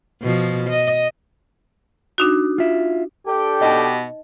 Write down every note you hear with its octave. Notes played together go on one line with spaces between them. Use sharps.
B2 F3
D#5
D4 D#4 F#4
F4 E5
D4 G4 A4 G5
B2 D#4 D#5